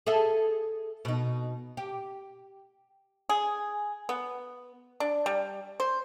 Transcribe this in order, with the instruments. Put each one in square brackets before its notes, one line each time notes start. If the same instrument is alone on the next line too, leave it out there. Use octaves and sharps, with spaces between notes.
[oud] G#4 A4 E5
B2 D#4
G4
[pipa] G#4
B3
D4
G3
C5